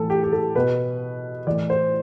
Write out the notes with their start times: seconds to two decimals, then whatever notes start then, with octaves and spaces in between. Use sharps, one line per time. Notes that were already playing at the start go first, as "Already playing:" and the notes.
Already playing: A2 E3 A4
0.10 G4
0.24 G4
0.32 A4
0.55 B2 B4
1.47 A2 E3 D5
1.70 C5